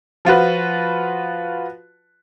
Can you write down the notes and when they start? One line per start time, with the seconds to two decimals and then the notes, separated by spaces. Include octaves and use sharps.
0.25 F3 F4 F#4 B4